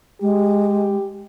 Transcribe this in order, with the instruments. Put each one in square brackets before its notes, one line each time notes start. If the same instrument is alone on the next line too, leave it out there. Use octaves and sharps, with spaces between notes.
[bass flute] G#3 [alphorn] G4